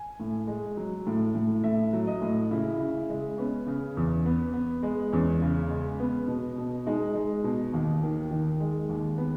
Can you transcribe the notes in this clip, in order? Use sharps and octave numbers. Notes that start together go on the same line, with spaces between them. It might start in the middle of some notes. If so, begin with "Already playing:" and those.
Already playing: G#5
A2
G#3
F#3
A2
A2
A2 E5
F#3
D#5
A2
C#3 E4
C#3
G#3
B3 C#4
C#3
E2
B3
B3
G#3
E2 C#4
C#3
G#3
B3
B2
B2
G#3 D#4
G#3
B2
D#2
D#3
D#3
G#3
D#2
B3